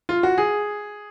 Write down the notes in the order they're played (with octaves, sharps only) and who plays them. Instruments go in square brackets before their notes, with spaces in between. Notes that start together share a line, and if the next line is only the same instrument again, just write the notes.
[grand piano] F4
F#4
G#4